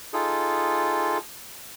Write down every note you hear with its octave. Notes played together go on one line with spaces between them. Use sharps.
D#4 F4 G#4 A4